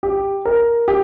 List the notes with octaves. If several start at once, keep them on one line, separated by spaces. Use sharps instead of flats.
G4
A#4
G4